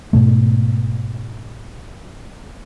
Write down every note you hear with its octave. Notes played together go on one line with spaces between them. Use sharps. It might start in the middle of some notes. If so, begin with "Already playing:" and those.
G#2 B2 A3